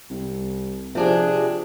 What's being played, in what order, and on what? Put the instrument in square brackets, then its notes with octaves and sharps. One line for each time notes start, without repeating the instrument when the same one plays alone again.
[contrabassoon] C2
[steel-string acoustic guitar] C3 D4 G#4 [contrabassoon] F3